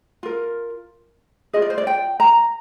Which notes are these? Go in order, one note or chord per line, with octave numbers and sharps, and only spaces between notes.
F4 A#4
F4 G#4 D#5
D5
C5
D5
G5
A#5